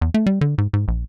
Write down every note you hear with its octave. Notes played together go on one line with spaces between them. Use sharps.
E2
A3
G3
D3
G#2
G#2
A#1